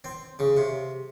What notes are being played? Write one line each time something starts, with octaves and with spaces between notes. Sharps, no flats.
C4
C#3
C3